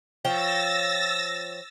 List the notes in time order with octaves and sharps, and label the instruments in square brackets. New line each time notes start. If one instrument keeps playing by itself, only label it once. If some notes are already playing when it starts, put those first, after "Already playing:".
[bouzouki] F3 C#5 G5 [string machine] E6 A6 A#6